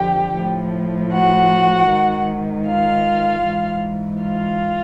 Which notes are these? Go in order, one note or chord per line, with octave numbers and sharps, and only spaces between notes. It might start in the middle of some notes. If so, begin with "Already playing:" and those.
Already playing: F2 D3 F3 G4 G5
A2 F3
F#4 F#5
G#2 D#3
F4 F5
G#2 E3
F4 F5